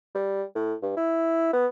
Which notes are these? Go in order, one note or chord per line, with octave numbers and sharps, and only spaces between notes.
G3
A2
G2
E4
B3